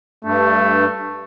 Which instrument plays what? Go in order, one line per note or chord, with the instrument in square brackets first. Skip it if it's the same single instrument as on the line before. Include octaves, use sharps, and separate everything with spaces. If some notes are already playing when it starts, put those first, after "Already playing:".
[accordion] G2 [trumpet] A3